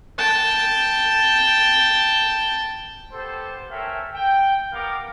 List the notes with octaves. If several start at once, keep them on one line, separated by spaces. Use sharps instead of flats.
G5 A5
B3 G4 A4 C5
C#4 A4 A#4 E5 G5
G5
G3 B3 A#4 F5 D6